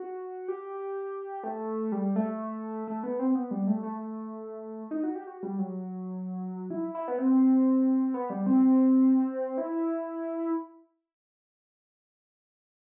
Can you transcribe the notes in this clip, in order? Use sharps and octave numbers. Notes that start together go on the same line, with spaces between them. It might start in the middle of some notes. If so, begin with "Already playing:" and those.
Already playing: F#4
G4
A3
G3
A3
A3
B3
C4
B3
G3
A3
A3
D#4
F#4
G4
F#4
G3
F#3
E4
E4
B3
C4
B3
G3
C4
E4